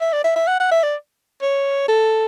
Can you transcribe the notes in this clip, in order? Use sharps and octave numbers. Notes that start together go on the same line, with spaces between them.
E5
D5
E5
E5
F#5
F#5
E5
D5
C#5
A4